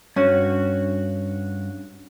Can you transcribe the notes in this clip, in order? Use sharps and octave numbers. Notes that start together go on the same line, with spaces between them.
G2 C#4 F#4